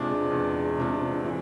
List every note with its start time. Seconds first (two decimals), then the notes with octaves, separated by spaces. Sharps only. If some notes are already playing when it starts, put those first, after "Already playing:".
Already playing: E2 C3 G#3 D4 F4
0.31 E2
0.77 C3 G#3 D4 F4
1.24 E3